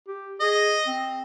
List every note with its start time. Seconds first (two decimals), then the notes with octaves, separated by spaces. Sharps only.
0.08 G4
0.40 G#4 D#5
0.87 C4